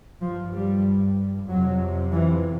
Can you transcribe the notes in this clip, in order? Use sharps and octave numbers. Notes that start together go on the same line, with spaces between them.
G2 F3
G3
F2 C3 F#3
E3